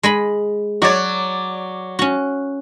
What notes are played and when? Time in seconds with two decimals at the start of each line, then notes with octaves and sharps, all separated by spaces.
0.03 G#3 D#5 B5
0.82 F#3 F#4 C#5 D5
1.99 C#4 F#4